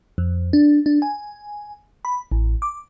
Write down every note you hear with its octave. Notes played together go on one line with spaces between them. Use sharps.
F2
D4
D4
G#5
B5
A1
D6